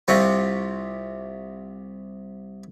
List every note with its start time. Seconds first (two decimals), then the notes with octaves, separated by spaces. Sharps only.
0.08 C2 C3 C4 F4 C#6